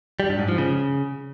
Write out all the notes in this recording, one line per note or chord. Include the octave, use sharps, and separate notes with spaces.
G3
G2
G#2
F3
C#3